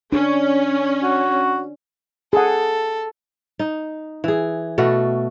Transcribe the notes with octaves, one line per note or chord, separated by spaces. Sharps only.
C#4 D4
F#4
G#4 A4 F#5
D#4
E3 G#4
B2 A3 F#4